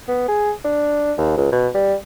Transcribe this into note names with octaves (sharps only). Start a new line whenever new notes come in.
B3
G#4
D4
D#2
C#2
B2
G3